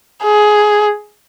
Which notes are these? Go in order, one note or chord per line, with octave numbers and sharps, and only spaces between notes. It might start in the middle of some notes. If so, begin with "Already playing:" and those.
G#4